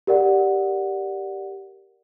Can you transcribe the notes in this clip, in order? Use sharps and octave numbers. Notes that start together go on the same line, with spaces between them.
G4 A#4 D5 F#5